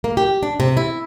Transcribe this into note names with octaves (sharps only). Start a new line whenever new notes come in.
A#3
G4
D4
C3
E4